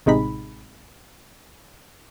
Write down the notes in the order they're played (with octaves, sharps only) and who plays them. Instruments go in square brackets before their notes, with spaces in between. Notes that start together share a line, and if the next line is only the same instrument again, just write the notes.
[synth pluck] A1 C3 G#3 D#4 B5